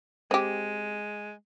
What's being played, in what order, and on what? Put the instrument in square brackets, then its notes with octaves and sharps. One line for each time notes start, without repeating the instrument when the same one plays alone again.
[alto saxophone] G#3 [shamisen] C4 G4